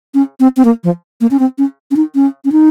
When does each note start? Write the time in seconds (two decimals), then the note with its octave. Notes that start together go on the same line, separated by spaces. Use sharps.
0.14 C#4
0.40 C4
0.57 C4
0.65 A#3
0.84 F3
1.21 A#3
1.31 C#4
1.39 C4
1.58 C#4
1.91 C#4
1.96 D#4
2.15 C#4
2.45 C#4
2.52 D#4